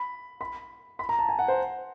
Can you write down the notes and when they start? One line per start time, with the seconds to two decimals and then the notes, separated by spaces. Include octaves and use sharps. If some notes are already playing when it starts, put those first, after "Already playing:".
Already playing: B5
0.41 B5
0.99 B5
1.09 A#5
1.19 A5
1.29 G#5
1.39 F#5
1.48 C5